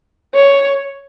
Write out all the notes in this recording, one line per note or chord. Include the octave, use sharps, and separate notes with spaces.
C#5